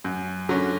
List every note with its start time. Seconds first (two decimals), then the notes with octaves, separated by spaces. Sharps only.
0.04 F#2
0.49 D3 F#3 C#4